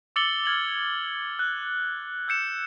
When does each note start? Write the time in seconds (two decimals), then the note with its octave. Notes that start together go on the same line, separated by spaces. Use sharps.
0.16 D6 E6 A6 C#7 F#7 G7
0.45 F6 G#6 F#7
1.39 F#6
2.28 E6 G6 C#7 E7